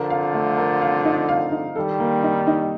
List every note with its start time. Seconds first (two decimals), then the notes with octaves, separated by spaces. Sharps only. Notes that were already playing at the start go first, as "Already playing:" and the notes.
Already playing: D3 F3 A#4
0.10 F5
0.34 A3
0.58 A#4
0.82 F5
1.05 D#4
1.29 F5
1.52 D#4
1.75 D#3 G3 A4
1.99 A#3
2.23 D#4
2.47 D#4